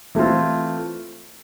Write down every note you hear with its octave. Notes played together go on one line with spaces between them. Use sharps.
E3 A3 C4 F4